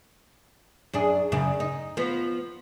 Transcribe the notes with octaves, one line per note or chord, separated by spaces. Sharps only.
F#2 D4 G#4
F#2 C#3
D#4
F3 B3